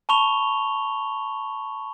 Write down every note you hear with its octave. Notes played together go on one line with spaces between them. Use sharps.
A5 B5 C#6 F7 G7